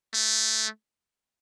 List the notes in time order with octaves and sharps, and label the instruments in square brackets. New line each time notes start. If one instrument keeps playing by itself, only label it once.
[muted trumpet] A3